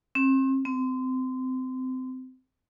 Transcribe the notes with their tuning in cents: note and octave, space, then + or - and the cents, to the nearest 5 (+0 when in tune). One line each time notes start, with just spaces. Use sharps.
C4 +35
C4 -25